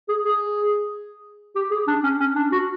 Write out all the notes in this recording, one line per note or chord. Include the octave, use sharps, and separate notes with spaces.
G#4
G#4
G4
G#4
D4
C#4
C#4
D4
F#4